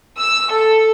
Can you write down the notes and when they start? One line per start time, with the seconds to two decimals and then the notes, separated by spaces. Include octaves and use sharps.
0.18 E6
0.52 A4